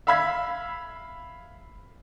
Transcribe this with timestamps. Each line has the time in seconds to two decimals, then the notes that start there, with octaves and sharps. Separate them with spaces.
0.07 E5 F5 B5 E6 G#6 B6